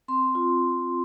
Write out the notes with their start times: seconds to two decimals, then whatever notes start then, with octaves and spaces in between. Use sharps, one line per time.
0.08 C4 C6
0.35 F4